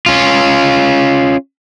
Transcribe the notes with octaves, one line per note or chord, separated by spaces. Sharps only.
C#4 F4